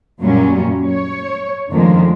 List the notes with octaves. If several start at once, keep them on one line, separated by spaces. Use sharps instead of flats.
F#2 A#2 F#3 G3 C#4
C#5
F2 D3 D#3 G#3 A#3